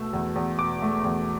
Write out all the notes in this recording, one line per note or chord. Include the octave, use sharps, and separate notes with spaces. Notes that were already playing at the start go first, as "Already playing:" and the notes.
Already playing: B2 A3 E6
E2
E2
B2 D6
A3
E2